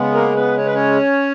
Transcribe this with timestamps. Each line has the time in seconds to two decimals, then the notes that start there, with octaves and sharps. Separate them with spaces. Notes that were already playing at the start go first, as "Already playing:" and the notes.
Already playing: C#3 G#3 B3
0.13 A#3 A#4
0.35 B3 B4
0.58 C#5
0.66 B4
0.74 C#4 C#5